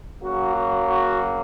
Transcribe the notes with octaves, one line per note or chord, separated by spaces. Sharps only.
C#3 F#3 A#3 F#4
F#4
F#4